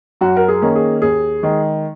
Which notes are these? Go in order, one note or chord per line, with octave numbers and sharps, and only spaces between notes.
F#2 F#4
A#4
G#4
D#3 A#3 C#4
G#4
D#2 G#4
D#3 G#3